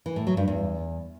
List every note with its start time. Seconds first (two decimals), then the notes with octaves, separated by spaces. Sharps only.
0.06 E3
0.16 A2
0.27 F#3
0.37 G2
0.48 E2